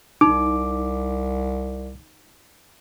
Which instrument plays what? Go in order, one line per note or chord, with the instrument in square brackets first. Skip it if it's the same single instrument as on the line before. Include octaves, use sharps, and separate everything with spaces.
[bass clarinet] C2 [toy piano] D#4 [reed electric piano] D6